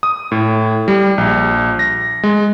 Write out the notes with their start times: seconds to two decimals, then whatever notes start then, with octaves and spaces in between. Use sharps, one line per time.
0.03 D#6
0.32 A2
0.88 G3
1.18 A#1
1.79 A#6
2.23 G#3